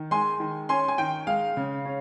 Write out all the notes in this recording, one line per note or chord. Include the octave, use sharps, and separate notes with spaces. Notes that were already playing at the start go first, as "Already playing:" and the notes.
Already playing: D#3
G#3 G#5 C6
D#3
C#4 G#5 C6
G#5
D#3 G5
G#3 F5
C#3
C#4